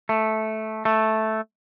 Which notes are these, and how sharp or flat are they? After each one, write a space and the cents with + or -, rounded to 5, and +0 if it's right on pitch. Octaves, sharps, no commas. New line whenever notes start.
A3 -10
A3 -5